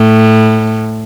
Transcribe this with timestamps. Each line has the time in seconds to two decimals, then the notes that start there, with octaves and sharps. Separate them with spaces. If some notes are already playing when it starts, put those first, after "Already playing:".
Already playing: A2